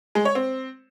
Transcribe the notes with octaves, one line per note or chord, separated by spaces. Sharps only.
G#3
C#5
C4